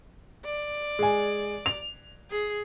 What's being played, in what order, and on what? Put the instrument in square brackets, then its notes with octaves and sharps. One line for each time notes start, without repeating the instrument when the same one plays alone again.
[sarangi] D5
[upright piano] G#3 G#5
F7
[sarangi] G#4